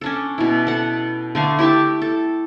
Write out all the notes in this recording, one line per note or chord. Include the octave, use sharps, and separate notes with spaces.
C#4 D4 A4
B2 E4
A4 F#5
D3 A3 F5
E4 G4 E5 A5
A4